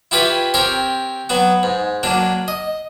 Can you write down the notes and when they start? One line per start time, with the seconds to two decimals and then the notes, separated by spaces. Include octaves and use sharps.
0.11 E4 F4 G4 B4 C#5 B5
0.54 C4 G4 A#4 C#5
1.29 F#3 B3 F#4
1.63 G#2
2.03 F#3 A#3 D4
2.48 D#5